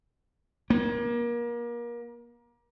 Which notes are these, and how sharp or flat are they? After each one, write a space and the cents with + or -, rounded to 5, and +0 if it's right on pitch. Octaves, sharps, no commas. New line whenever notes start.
A#3 +30